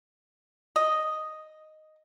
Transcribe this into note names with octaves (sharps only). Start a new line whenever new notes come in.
D#5